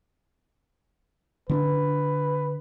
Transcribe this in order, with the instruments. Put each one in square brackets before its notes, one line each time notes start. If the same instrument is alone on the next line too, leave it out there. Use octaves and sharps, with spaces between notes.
[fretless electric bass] D3 C#4 D4 [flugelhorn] B4